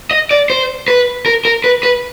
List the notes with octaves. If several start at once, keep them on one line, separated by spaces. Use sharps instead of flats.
D#5
D5
C5
B4
A#4
A#4
B4
B4